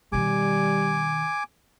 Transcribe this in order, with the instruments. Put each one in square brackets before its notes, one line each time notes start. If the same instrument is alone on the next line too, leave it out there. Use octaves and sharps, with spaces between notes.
[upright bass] B2 D#3 [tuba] G3 [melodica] G#5 D6